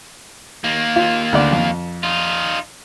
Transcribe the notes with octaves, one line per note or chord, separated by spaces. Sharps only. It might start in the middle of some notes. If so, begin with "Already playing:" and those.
D#2 A#3
F4
D2 D3 D5
F2
D#4 F4